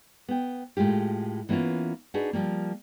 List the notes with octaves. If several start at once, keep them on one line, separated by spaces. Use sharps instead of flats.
B3 G5
A2 G#3 F4 G4
E3 A#3 B3 C#4 F4
D4 D#4 F#4 G#4 B4
F3 G3 A#3